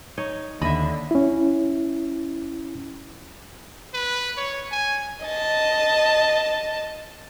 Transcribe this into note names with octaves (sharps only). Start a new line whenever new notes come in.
D#4 C#5
D#2 D3 D#5 E5 B5
C#4 E4
B4
C#5
G#5
D#5 A5